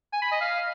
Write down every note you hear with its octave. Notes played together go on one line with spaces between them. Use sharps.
G#5
B5
D#5
F5